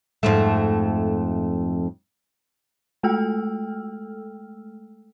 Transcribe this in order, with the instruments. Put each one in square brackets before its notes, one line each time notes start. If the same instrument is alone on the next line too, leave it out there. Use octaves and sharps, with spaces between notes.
[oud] F2 G#2 A3
[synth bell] G#3 A3 A4 G5 E6 F6